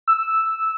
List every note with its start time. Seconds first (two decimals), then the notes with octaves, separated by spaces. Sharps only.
0.08 E6